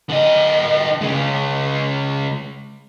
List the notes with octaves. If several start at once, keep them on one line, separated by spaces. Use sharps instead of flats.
D3 D#5
C#3 G#3